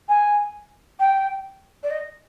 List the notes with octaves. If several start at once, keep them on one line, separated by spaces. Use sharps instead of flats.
G#5
G5
D5
D#5